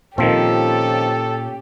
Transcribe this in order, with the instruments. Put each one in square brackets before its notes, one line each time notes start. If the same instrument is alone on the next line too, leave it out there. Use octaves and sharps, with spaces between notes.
[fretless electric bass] A#2 [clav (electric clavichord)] D#3 F3 C4 [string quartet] C#4 G4 [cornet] A4